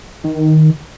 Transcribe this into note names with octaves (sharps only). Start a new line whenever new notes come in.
D#3